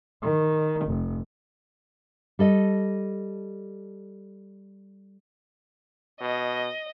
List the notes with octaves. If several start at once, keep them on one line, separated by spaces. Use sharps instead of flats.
D#3
F1
G3 A4 D#5
B2 D#5